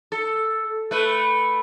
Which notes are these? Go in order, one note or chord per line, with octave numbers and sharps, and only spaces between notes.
A4
A3 B4